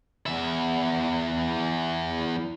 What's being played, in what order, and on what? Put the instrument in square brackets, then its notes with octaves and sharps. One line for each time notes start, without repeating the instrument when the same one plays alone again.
[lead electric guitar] E2 E5